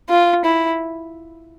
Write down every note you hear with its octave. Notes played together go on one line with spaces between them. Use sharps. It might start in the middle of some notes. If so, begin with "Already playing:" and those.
F4
E4